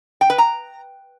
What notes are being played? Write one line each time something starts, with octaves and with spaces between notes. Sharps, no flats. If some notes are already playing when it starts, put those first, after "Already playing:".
G5
B4
A#5